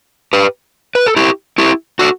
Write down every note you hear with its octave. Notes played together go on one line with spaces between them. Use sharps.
G4 B4
B4
A4
E4 G4
E4 G4
F#4 A4